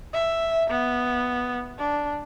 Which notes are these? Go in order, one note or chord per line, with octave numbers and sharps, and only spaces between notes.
E5
B3
D4